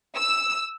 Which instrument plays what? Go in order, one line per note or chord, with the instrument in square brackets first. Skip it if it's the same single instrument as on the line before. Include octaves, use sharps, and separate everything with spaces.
[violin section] E6